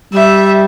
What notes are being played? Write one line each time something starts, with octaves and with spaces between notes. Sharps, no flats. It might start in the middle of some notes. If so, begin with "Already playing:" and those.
G3 E5